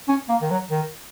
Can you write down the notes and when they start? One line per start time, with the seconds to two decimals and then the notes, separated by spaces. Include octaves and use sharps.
0.08 C#4
0.29 A#3
0.42 D#3
0.51 F#3
0.71 D#3